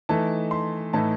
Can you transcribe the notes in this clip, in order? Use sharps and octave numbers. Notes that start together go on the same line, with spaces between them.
E3 A3 D#4 A5
C6
A2 E3 A3 D#4 A5